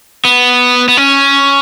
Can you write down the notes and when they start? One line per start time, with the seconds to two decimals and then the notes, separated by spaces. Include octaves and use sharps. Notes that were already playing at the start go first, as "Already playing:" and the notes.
0.25 B3
0.88 B3
0.97 C#4